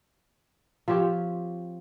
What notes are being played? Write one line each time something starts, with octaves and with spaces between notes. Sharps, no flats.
F3 C4 G4 C#5